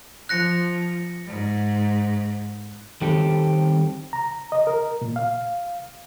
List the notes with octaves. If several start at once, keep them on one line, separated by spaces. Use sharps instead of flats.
F3 F#6 A#6 C#7
G#2
D#3 G3 C4 G4 A4
A#5
D#5
A#4
A#2
F5